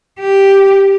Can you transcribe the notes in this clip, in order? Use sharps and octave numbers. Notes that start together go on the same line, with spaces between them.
G4